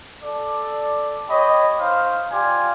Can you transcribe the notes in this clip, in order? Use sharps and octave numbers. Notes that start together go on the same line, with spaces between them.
A4 D5
G4 C#5 D#5 B5
D#4 C5 F5
F4 G4 D5 G#5